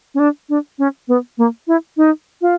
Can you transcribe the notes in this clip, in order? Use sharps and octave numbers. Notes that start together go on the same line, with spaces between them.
C#4
D4
D4
C#4
B3
A#3
E4
D#4
F4